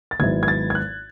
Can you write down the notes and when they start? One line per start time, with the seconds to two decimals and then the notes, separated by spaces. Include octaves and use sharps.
0.11 A6
0.19 G#1 G#2 F#3 B3 E4 G#6
0.43 G#6
0.48 A6
0.70 G#6
0.75 F#6